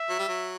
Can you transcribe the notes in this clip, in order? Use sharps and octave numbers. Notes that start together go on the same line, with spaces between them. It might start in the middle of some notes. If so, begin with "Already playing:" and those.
Already playing: E5
F#3
G3
F#3